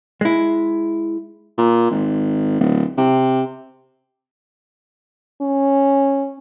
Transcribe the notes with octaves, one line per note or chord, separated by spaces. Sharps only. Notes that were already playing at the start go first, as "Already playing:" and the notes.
G#3 E4
A#2
G#1
D1
C3
C#4